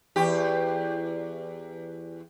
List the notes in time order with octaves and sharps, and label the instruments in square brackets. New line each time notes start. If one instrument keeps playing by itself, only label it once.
[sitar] E2 G4